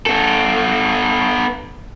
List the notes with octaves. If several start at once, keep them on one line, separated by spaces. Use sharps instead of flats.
B3 A4